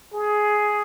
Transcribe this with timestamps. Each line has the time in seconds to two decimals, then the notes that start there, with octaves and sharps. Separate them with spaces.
0.14 G#4